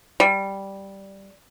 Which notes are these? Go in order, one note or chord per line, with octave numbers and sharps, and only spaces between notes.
G3